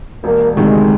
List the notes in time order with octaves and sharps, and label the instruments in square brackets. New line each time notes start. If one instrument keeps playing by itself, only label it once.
[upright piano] E1 [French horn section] A#3
[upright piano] D2 C3 D#3 [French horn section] G#3